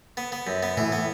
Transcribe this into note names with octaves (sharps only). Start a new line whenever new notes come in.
B3
B3
F#2
B3
A2 E3
A2 B3